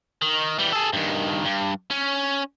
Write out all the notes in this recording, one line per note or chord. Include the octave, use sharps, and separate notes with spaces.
D#3
E3 G3
G#4 A4
G2 D#3
G2
C#4